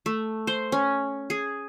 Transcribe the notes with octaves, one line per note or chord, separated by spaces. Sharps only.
A3
C5
C#4
G#4